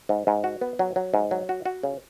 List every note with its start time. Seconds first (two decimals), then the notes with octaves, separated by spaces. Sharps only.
0.09 G#2
0.27 G#2
0.44 F#4
0.61 B3
0.79 F#3
0.96 F#3
1.14 G#2
1.31 F#3
1.49 F#4
1.65 F#4
1.83 C#3